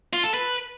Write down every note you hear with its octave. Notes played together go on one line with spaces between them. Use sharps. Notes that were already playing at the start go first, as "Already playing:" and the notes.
F4
A4
B4